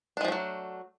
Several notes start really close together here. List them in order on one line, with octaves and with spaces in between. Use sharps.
D4 G#3 F3 A3 F#3